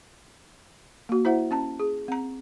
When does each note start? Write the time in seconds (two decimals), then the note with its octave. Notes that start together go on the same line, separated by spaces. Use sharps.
1.09 A#3 F#4
1.25 E4 C5 E5 F#5
1.51 C#4 A5 A#5
1.80 G#4
2.08 C4 A#5